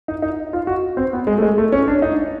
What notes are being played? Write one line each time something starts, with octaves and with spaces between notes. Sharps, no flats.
D#4
D#4
F4
F#4
C4
B3
G#3
A3
G#3
A3
C#4
D4
D#4